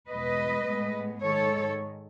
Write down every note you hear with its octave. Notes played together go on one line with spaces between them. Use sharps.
E2 B2 G#3 B4 D#5
A2 G#3 B3
G#2 D#3 G#3 A4 C#5